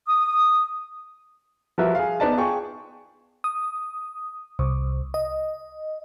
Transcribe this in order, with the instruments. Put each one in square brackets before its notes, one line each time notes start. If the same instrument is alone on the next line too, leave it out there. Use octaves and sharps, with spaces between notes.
[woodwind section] D#6
[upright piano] F3 G3 F#4 A#4 B4 E5
G#4 F5
B3 D#4 B4 D5 A5
F4 G#4 G5 C#6
[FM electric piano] D#6
C2
D#5